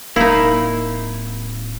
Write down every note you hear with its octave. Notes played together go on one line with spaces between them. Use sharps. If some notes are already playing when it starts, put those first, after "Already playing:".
D1 A#3 D#4 E4